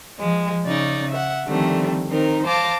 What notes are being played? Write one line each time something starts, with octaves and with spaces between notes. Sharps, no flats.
F3 G#3
C#3 D#4 D5
E5 F#5
D3 D#3 F3 G3 A3 C4
D#3 C4 D#4 A#4
C5 F5 A5 D6 A#6